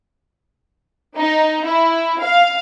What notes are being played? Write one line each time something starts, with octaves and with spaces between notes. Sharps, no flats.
D#4
E4
F5